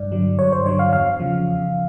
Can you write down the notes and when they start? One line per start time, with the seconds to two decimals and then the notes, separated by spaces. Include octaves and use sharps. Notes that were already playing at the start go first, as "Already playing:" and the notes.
Already playing: G2 D5
0.12 D3 F#3
0.39 G2 C#5
0.52 C5
0.66 D3 F#3 C#5
0.79 F5
0.93 E2 F5
1.20 C#3 F3
1.47 E2